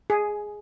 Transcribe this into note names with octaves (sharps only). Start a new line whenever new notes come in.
G#4